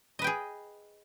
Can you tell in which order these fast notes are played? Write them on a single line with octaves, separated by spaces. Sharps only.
D#5 B4 G5 G#4